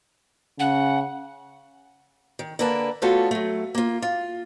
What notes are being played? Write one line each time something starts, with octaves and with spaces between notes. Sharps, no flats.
C#3 F#5
D#3
D3 A#3 A#4 B4 A5
A3 B3 C#4 F4 F#4 A4
F#3 A3
A#3 F4
F4